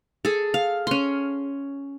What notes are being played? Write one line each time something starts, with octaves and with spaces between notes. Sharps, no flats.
G#4 A4
F5
C#4 C6